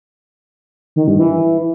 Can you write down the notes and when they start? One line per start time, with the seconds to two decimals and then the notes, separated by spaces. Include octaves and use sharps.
0.96 D#3
1.08 G2
1.19 E3